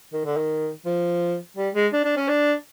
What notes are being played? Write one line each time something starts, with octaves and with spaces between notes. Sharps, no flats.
D#3
D3
D#3
F3
G3
G#3
D4
D4
C#4
D4